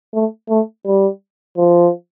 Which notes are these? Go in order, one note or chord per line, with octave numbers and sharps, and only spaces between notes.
A3
A3
G3
F3